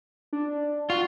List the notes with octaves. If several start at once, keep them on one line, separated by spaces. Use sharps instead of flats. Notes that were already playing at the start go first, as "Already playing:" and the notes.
D4
F4 F#4